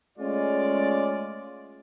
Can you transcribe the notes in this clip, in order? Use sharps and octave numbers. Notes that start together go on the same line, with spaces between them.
G#3 A3 C#4 F4 D5